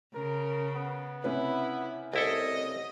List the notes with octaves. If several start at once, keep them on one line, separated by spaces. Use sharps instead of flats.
C#3 A#4
B3
C3 C#4 E4 B4
C2 E4 A4 D#5